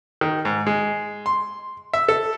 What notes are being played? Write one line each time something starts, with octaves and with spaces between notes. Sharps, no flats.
D#3
G#2
G#3
C6
E5
A4